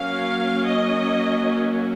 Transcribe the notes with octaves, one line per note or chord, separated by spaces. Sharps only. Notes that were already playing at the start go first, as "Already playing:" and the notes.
Already playing: F#3 A#3 C#4 F5
D#5